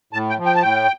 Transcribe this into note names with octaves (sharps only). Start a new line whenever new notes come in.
A2 A5
G5
F3
G5
A5
A2 G5